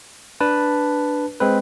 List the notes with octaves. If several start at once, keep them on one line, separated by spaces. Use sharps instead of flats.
D4 B4 A5
G#3 C4 B4